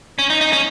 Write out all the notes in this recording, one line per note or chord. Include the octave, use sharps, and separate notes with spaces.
C#4
D#4
D#4
C#4